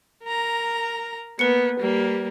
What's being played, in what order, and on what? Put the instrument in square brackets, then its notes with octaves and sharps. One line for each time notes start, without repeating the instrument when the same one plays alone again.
[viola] A#4 A#5
[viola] A#3 B3 [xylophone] B4 C#7
[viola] G3 A#3